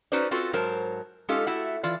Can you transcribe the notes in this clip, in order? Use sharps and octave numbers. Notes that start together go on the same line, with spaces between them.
C#4 D#4 F#4 B4 C5 D5
C4 F4 F#4 A4 B4
G#2 F#3 A#4 C5 A5
G#3 C#4 D#4 F4 G4 A4
A3 E4 F#4 G4 F#5
E3 F4 D5